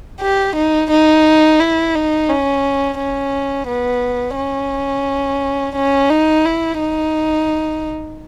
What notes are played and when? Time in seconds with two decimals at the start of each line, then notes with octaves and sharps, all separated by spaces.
0.21 G4
0.56 D#4
0.91 D#4
1.60 E4
1.95 D#4
2.29 C#4
2.99 C#4
3.68 B3
4.36 C#4
5.75 C#4
6.10 D#4
6.45 E4
6.79 D#4